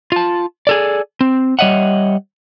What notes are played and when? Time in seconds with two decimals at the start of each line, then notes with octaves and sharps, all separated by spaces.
0.12 F4 A5
0.67 G#4 A4 D5
1.21 C4
1.59 G3 C#5 D#5 E5 F#5